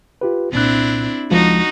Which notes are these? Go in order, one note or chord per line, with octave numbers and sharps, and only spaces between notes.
F4 G4 B4
C2 A#2 C4 D4 E4 F#6
C#2 F3 G#3 D#4 F#4